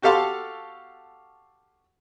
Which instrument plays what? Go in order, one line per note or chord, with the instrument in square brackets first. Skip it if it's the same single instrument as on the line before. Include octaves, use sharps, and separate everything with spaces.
[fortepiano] F#4 G4 A4 F5 A5 C6